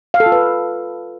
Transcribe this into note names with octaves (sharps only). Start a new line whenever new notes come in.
F5
A4
F4
B4